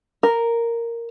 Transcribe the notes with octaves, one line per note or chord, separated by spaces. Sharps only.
A#4